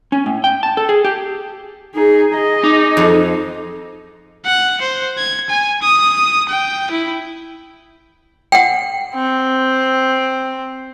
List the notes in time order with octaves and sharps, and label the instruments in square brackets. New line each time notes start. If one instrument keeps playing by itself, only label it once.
[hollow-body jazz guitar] C#4
A2
G5
A5
A4
G#4
G4
[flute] D#4 [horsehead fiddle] G#4
[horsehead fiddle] G#4 D#5 [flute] A#5
[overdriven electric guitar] D#4 [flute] D6
[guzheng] F2
[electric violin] F#5
C5
G#6
G#5
D#6
G5
E4
[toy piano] F#5 G5
[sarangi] C4